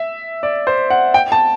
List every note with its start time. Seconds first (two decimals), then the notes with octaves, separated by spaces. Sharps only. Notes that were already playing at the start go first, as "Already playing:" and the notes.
Already playing: E5
0.43 D5
0.67 C5
0.90 F#5
1.14 G5
1.32 A5